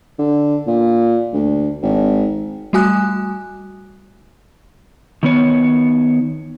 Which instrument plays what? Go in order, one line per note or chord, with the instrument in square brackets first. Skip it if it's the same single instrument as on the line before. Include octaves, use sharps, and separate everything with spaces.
[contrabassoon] D3
A#2
D2
G#1
[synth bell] G3 A3 F#4 G#5 D#6 F#6
[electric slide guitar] D#3 B3 C#5